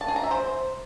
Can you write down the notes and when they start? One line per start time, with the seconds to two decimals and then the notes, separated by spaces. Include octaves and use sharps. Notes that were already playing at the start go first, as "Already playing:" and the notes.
0.01 A5
0.08 G#4
0.16 A#5
0.23 E5
0.31 C5